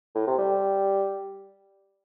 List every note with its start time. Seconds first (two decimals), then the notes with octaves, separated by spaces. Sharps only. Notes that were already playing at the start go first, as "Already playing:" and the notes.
0.15 A2
0.27 C3
0.38 G3